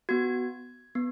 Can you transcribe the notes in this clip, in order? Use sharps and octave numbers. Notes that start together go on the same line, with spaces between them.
B3 F#4 G#6
B3